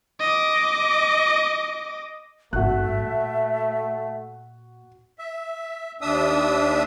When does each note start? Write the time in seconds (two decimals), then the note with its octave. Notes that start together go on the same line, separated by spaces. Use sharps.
0.20 D#5 D6
2.53 G#1 G2 A3 F#4 E5 F#6
2.98 A#2
5.19 E5
6.01 D#2 D4 E5 D#6 E6